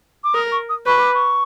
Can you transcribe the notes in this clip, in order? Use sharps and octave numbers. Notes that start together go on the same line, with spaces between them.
D6
A#4 D#6
C#6
D#6
B4 C#6
D6
C#6